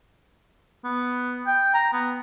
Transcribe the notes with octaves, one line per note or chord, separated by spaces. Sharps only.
B3
G5
A#5
B3